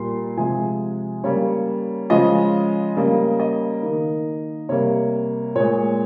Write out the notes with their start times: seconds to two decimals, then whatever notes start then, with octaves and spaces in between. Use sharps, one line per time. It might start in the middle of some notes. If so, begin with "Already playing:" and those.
Already playing: A#2 G3 A#3 C6
0.37 C3 F3 G#3 G#5
1.24 C#3 G3 A#3 C#5
2.10 C#3 F3 G#3 D#5
2.97 C#3 G3 A#3
3.40 D#5
3.83 D#3 A#3
4.69 C3 G3 A#3 C#5
5.55 A#2 G#3 C#5